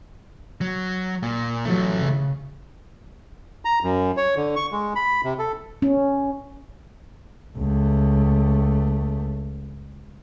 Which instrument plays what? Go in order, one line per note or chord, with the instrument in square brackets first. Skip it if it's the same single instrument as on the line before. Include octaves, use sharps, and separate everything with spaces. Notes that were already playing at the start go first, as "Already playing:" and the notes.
[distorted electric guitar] F#3
A#2
[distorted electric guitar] E3 A3 [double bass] F#3
[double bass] C#3
[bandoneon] A#5
F#2
C#5
D3
C#6
G#3
B5
C3
A4
[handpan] C#4
[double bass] C#2 A3